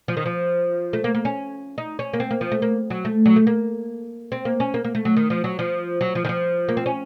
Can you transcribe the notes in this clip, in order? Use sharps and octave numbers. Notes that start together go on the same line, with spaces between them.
F3
D#3
F3
A3
A#3
A#3
C#4
D#4
C#4
A#3
C4
A#3
F3
A3
A#3
F#3
A3
F#3
A3
A#3
C4
A#3
C#4
A#3
A#3
A3
F#3
D#3
F3
F#3
F3
F#3
F3
D#3
F3
A#3
C4
C#4